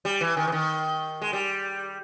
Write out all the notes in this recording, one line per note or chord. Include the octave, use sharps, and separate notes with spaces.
G3
E3
D#3
E3
D#3
G#3
G3